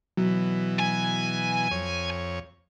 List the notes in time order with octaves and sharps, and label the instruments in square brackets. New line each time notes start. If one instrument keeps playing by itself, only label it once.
[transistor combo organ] B2 E3 [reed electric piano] F#3
[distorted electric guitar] G#5
[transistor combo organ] F2 C#5